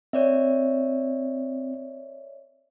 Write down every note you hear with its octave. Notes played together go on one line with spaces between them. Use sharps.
C4 C#5 D5 E5